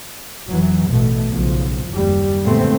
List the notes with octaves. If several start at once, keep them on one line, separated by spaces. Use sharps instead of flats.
F1 E3 F#3
A1 B2 A3
B1 C#3 F3
F#1 D#2 G3
A#2 D3 G#3 A3 B3 C4